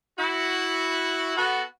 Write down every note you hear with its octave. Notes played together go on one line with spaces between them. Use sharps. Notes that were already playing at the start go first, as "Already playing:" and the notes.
E4 F#4
B3 F#4 A4